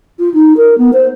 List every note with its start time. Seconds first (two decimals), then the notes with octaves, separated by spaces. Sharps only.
0.19 F4
0.34 D#4
0.57 A#4
0.78 B3
0.93 C5